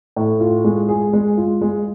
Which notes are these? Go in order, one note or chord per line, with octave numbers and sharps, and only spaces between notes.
A2
F4
G#3
G#4
G#3
F4
G#3